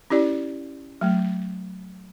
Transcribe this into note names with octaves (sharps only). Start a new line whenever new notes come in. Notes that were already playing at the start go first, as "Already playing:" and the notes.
C#4 E4 G4 D5
F#3 A3